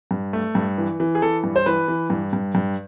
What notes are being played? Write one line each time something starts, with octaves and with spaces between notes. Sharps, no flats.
G2
A3
G2
E3
E3
G#4
E3 A4
G2
C5
E3 B4
E3
G2
G2
G2